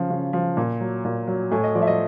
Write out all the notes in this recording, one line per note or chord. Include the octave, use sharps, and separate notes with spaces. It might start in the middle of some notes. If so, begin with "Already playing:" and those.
Already playing: C#3 F3
C#3
F3
A#2
F#3
A#2
F#3
A2 G#5
D#5
F3 D5
E5
D#5